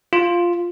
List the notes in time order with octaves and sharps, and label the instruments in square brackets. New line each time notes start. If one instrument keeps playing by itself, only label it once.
[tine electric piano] F4